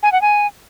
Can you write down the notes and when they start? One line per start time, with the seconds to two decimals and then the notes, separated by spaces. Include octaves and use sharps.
0.03 G#5
0.12 F#5
0.21 G#5